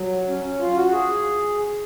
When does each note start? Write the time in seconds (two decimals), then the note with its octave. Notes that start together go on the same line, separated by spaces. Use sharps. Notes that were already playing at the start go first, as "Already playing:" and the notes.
Already playing: F#3
0.28 C#4
0.44 C#4
0.59 F4
0.75 F#4
0.91 G#4